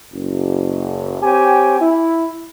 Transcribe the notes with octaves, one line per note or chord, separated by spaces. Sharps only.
F#1
C4 G4 C#5 G5 G#5
E4